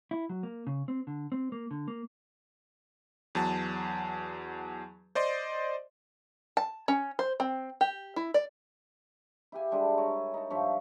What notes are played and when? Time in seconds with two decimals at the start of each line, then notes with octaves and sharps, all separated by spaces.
0.11 E4
0.29 F#3
0.43 A#3
0.67 C#3
0.88 C4
1.07 D3
1.32 C4
1.52 A#3
1.71 D3
1.88 A#3
3.35 E2 F#3 A5
5.15 C5 D5 D#5 C6
6.57 A5
6.88 C#4
7.19 C5
7.40 C4
7.81 G4
8.16 E4
8.34 D5
9.52 E4 G4 G#5
9.71 G3 G#3 D4 E4
9.98 A#4 C#5 G#5
10.34 D#4 A5
10.50 G2 F3 C#5 E5